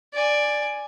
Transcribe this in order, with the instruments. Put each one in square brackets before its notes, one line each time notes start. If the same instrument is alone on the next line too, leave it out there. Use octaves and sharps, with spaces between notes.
[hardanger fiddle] D5 G#5